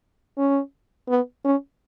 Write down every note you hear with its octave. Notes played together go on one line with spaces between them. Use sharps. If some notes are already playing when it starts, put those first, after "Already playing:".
C#4
B3
C#4